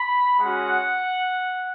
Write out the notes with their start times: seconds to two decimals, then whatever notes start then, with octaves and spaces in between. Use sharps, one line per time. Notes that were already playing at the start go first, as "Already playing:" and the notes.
Already playing: B5
0.38 G#3 C#4 F#4 F#5